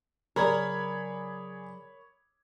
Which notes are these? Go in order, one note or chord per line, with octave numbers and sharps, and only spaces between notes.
C#3 F#3 G#4 A#4 C#5 D5 B5 G#6